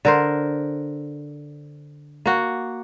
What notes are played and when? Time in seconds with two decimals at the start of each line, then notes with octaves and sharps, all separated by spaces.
0.05 D3 A#4 C5
2.26 A#3 F#4